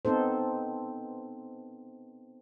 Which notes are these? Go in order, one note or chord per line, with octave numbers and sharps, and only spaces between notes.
B3 C4 D#4 A4 C5